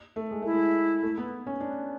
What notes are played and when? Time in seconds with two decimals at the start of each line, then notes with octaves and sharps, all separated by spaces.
0.16 A3
0.31 G#3
0.42 A3 E4
0.53 G#3
1.02 A3
1.18 B3
1.47 C#4
1.60 D4